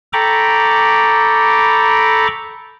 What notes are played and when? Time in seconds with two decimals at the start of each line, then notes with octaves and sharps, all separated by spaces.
0.13 A4 G5 A#5 B5 C#6 D6